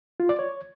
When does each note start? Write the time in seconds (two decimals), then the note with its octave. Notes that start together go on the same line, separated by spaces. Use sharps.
0.20 F4
0.29 D5
0.39 C#5